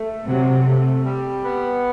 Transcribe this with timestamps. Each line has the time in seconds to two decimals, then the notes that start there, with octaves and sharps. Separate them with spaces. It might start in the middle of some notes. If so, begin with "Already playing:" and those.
Already playing: A3
0.26 C3 F#3
0.66 A3
1.05 G3
1.43 B3